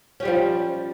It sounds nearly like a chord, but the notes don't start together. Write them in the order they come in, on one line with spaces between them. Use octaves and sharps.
C#4 G4 G3 F3